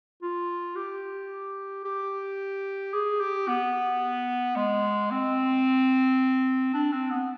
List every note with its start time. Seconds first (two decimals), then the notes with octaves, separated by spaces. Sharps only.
0.22 F4
0.76 G4
1.84 G4
2.93 G#4
3.20 G4
3.48 B3
4.56 G#3
5.11 C4
6.74 D4
6.92 C4
7.10 B3